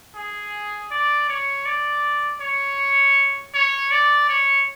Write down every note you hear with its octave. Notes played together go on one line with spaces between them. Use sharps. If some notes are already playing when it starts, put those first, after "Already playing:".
G#4
D5
C#5
D5
C#5
C#5
D5
C#5